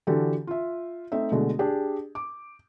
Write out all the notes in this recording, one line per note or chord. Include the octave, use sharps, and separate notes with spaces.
D3 E3 F#4 G4 A4
F4 E5
A3 C4 D#4 E5
B2 D3 G#3 A3
D4 G4 G#4
D6